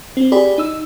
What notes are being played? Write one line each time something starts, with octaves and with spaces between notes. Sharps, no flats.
C4
G4 G#4 D5 B5
D#4 E6